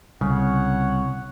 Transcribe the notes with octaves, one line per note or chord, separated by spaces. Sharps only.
C2 C#3 C#5 F#5